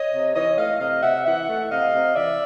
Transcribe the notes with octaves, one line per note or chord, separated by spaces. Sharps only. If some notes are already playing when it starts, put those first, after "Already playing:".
Already playing: C#5 D#5
C3
E3 C#5 D#5
A3 D#5 F5
C3 D#5 F5
C3 E5 F#5
E3 E5 F#5
A3
C3 D#5 F5
C3
E3 D5 E5